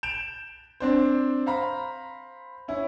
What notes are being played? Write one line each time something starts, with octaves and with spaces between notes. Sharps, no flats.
G6 D7 E7 F7
C4 D4 C5
C5 F5 A#5 B5
C#4 E4